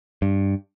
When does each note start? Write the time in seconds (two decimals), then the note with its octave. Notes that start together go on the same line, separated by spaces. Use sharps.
0.22 G2